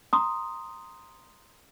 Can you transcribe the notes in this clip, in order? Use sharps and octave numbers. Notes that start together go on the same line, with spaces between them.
A#5 C6 D#6